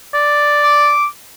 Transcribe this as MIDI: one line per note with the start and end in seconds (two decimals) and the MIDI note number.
0.14 0.90 74
0.64 1.08 86